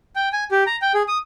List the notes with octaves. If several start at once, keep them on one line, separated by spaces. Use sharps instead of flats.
G5
G#5
G4
A#5
G5
G#4
D#6